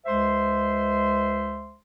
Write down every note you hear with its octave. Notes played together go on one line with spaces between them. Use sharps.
C#2 G#3 C5 E5 C6